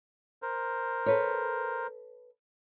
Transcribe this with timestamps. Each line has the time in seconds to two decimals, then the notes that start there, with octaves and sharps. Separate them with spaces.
0.42 A#4 C5
1.06 A4 B4 C#5